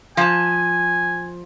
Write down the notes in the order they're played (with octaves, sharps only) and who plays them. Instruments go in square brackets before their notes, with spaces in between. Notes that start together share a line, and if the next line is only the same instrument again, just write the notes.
[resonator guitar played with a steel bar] F3 A5 [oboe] G#5